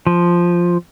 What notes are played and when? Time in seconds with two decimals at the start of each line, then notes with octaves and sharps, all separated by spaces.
0.07 F3